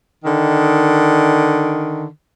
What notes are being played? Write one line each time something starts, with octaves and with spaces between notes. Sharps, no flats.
D3 D#3